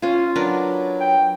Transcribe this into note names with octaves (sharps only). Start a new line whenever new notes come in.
C#4 F4
F#3 D4 A#4 B4
G5